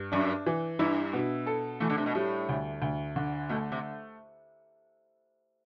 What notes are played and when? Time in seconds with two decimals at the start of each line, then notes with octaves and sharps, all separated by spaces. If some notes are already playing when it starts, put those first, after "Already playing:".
Already playing: G2
0.12 F#2 D4
0.46 E3
0.79 G2 E4
1.13 B2
1.47 A4
1.80 E3 A3
1.90 D3
1.98 C3
2.06 B2
2.15 A2 G3
2.49 D2
2.82 D2
3.16 D3
3.49 B2 A3
3.72 C3